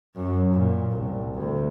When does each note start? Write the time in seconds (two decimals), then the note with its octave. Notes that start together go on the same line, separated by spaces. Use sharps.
0.16 F#2
0.54 A#2
0.91 C2
1.34 D2